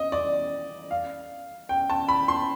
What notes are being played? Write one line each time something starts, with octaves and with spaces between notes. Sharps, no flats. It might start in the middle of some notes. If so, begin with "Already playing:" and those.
Already playing: D#5
D5
F5
G5
A5
B5
C6